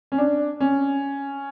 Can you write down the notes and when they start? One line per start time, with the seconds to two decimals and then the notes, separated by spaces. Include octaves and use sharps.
0.12 C#4
0.18 D4
0.60 C#4